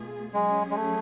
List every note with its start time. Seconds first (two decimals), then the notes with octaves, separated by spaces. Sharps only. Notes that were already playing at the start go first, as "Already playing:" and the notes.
Already playing: B2 A3 F4 G#4
0.33 F#3 G#3 C#4 G#4
0.71 G#3
0.76 A3